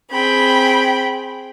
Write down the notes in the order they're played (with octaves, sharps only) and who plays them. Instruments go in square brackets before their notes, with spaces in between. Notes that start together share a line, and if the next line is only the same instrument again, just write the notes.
[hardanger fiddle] C4 G#4 [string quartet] G5 B5